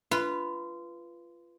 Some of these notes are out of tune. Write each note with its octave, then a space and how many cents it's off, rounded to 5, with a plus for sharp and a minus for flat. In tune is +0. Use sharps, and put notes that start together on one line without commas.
F4 -20 B4 +0